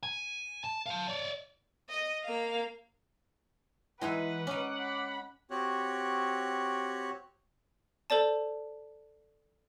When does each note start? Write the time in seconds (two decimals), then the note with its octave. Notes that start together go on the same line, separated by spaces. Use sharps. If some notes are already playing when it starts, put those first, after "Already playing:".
0.03 G#5
0.64 A5
0.86 F5 A5
1.08 C#5 D5
1.89 D#5
2.23 A#3 F5
4.01 E3 G#3 D#4 B4 E5 F#5
4.47 C#4 D#4 D6
4.78 B5
5.51 C4 F#4 G4 C#5 F#6
8.10 A4 C5 D5 A5